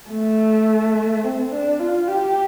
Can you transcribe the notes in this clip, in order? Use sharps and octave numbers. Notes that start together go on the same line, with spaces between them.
A3
C4
D4
F4
G4